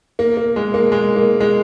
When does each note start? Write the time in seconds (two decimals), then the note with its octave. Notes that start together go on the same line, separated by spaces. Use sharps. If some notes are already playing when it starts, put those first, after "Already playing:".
0.19 A#3
0.37 A#3
0.56 G#3
0.74 A#3
0.92 G#3
1.16 A#3
1.40 G#3